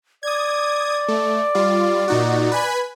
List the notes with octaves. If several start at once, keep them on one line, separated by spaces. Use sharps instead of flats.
D5 D#6 G#6
A3
G3 F4
A#2 D#4 F#4
B4 G#5 B5